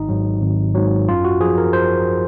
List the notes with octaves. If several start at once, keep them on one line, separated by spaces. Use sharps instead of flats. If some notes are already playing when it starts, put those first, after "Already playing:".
Already playing: G#1 D#4
G#2 F#3
G#1
G#2 F#3
F#2 F4
F#4
F3 G#4
A#4
C5